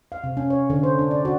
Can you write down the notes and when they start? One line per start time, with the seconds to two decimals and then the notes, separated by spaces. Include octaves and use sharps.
0.12 F5
0.24 C3
0.37 C#4
0.50 C#5
0.70 D3
0.83 C5
0.99 D4
1.11 D5
1.25 F#4